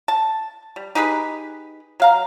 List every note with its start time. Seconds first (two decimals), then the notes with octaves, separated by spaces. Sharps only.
0.08 A5
0.76 G3
0.95 D#4 G4 G#4 B4
2.00 F#3 F5 A#5